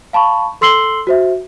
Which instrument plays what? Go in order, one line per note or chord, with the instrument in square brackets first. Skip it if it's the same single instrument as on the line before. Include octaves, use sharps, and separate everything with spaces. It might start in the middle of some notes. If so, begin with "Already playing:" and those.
[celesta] F5 A5 B5 C#6
A4 C6 E6 C7 F#7 G7
F#4 C5 E5